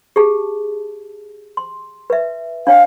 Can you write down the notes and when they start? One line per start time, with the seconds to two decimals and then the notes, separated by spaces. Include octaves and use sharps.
0.16 G4 G#4 A5
1.57 C6
2.10 B4 E5
2.67 D4 C#5 F5 G5